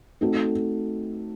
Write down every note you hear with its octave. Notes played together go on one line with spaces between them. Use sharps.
A3 C4 D#4 F#4 A4